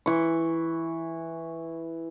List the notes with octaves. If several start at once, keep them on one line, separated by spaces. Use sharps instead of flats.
E3 C#6